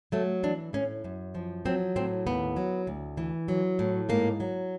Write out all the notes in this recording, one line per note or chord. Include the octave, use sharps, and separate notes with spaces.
F#3 A3
E3 D4
A2 C#4
F#2
F3
F#3 C4
A2 C4
D#2 B3
F#3
D2
E3
F#3
A2
G#2 A#3
F#3